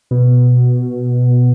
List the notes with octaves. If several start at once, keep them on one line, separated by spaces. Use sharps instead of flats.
B2